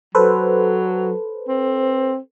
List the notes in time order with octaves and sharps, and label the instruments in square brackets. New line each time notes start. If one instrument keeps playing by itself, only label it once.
[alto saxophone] F#3 [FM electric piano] A4 B4 C5
[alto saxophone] C4